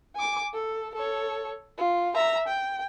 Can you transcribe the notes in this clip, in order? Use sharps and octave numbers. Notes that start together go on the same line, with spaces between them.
G#5 D6
A4
A4 C#5
F4
E5 A#5
G5